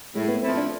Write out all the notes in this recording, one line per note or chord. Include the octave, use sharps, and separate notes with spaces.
A2 G#3
B3
F3 A3 C4 E4
D4